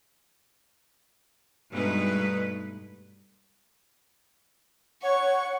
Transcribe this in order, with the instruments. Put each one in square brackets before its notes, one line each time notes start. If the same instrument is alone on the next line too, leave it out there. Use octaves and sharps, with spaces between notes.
[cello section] G2 B2 G#3 A3 D#4 B4
[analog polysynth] C#5 [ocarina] F#5 [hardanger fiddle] C#6